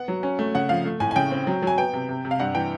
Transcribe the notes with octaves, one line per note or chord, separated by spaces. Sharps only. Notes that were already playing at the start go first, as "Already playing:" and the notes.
Already playing: B3 F#5
F#3
C#4
A3
C#3 F#5
F3 F5
A3
A2 G#5
G#5
C#3 G5
C4
F#3
F#3 G#5
B3 G5
C3
C3
C3
F5
G2 F#5
E3 G5